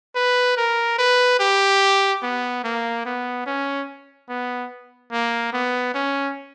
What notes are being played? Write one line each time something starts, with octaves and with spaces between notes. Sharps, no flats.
B4
A#4
B4
G4
B3
A#3
B3
C#4
B3
A#3
B3
C#4